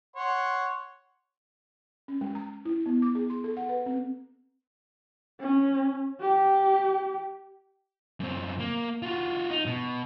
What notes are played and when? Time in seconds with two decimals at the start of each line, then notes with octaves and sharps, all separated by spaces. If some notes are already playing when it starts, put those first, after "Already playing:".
0.16 C#5 F#5 C6
2.08 C#4
2.21 G#3
2.35 A#5
2.65 E4
2.86 B3
3.02 D6
3.15 G#4
3.30 C6
3.44 A4
3.57 F#5
3.69 B4
3.86 C4
5.40 C#4
6.21 G4
8.20 F#2 C4
8.60 A#3
9.02 F4 F#4
9.51 D#4
9.66 B2